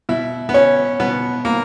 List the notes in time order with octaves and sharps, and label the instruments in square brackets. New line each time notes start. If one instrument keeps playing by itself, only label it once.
[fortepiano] B2 E4
B3
C#4
B2 B3
A#3